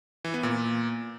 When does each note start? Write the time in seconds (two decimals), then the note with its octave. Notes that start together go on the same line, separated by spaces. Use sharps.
0.25 E3
0.34 B3
0.43 A#2